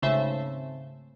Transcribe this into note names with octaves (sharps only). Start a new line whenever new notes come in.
G#1 C#3 A3 C5 E5 A5